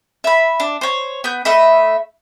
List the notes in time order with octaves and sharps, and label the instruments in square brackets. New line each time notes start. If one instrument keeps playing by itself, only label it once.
[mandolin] E5 B5
D4
C5 C#5
B3 G6
A3 D#5 E5 B5